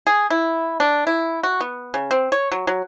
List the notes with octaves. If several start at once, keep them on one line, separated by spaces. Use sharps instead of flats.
G#4
E4
D4
E4
F#4
B3
C#3
C4
C#5
F#3
F#3